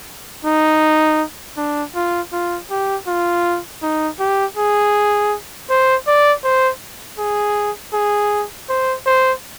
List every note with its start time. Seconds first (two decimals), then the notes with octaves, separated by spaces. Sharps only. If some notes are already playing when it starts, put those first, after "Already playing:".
0.45 D#4
1.57 D4
1.95 F4
2.33 F4
2.70 G4
3.07 F4
3.82 D#4
4.19 G4
4.57 G#4
5.70 C5
6.07 D5
6.44 C5
7.19 G#4
7.93 G#4
8.69 C5
9.06 C5